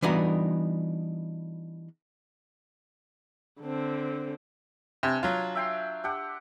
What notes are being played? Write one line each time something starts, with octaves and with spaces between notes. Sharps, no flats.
E3 G3 B3 D4 D#4 F#4
D3 C4
C3 D4 B4 G#5
F#3 F4
E5 G5 C6
D4 G4 F#5